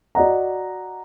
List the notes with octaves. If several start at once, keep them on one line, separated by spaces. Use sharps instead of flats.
F#4 D5 D#5 F#5 A#5